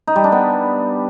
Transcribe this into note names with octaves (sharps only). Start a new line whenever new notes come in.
D#4
G3
D4
B3